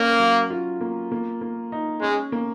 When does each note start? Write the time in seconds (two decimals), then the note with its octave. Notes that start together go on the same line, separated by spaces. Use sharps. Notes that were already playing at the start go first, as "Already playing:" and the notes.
Already playing: A#3 C#4
0.20 F#3
0.50 F4
0.81 A#3
1.12 A#3
1.41 A#3
1.72 D#4
2.02 G#3 C#4
2.32 A#3